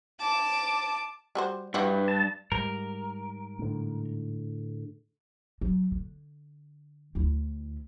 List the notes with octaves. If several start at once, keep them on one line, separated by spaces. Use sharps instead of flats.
A5 D6
G3 F#4 C5
G2 G3 E4 F#4 B4
A5
G#2 G3 A#4
A2 D3
F#3
D3
D2 E4